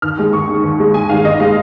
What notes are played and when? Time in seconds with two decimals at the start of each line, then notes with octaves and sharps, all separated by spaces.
0.02 D#2 F6
0.18 D#3 G#3
0.33 D#2 C#6
0.48 D#3 G#3
0.64 D#2
0.78 D#3 G#3
0.94 D#2 G#5
1.09 D#3 G#3 F5
1.25 G#1 D#5
1.40 G#3 F5